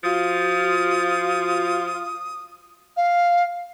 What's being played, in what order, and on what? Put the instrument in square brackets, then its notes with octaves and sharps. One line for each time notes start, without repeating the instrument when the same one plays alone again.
[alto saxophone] F3 [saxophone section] F4 [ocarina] F#4 [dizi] D#6
[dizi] F5